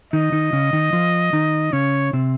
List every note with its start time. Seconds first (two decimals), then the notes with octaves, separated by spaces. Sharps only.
0.13 D#3 D#4 D#5
0.32 D#3 D#4
0.53 C#3 C#4
0.73 D#3 D#4
0.93 F3 F4
1.33 D#3 D#4
1.73 C#3 C#4 C#5
2.13 C3 C4